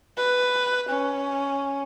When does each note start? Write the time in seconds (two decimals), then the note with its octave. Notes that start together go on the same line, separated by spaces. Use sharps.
0.17 B4
0.90 C#4